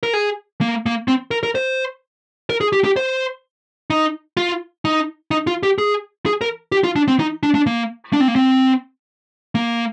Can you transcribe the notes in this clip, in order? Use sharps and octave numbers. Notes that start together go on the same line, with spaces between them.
A#4
G#4
A#3
A#3
C4
A#4
A#4
C5
A#4
G#4
G4
G4
C5
D#4
F4
D#4
D#4
F4
G4
G#4
G#4
A#4
G4
F4
D4
C4
D#4
D4
D4
A#3
D4
C4
A#3
C4
A#3